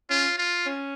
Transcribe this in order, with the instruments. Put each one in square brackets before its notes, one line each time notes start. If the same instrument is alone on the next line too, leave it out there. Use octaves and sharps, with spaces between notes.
[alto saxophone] C#4 [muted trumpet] F4
[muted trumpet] F4
[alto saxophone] C#4